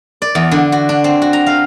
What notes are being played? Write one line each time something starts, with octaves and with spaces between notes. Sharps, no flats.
D5
E2
D3
F#4
D4
C4
F#4
A#5
F5